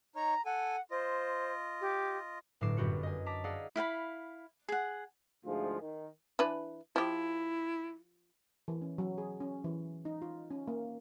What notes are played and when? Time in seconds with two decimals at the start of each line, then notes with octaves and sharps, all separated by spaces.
0.16 D#4 C#5 A#5
0.46 A4 F#5 G#5
0.91 F4 C5 D#5
1.81 G4
2.61 G1 A2 F#3 D6 C7 E7
2.77 G1 F#2 F#4 G4 B4 C#7
3.03 D#5 G#5
3.26 A5 A#5 D6 B6
3.44 G#4 D5 D#5 F5 F#5 E6
3.76 E4 F5 G5 B5
4.69 G#4 F#5
5.46 D2 G#2 F3 F4 G#4
5.80 D#3
6.39 E3 D4 B4
6.96 F3 E4 G4
8.68 E3
8.82 C#4
8.98 F#3
9.18 G#4
9.40 C#4
9.64 E3
10.05 D#4
10.22 F4
10.51 C#4
10.68 A#3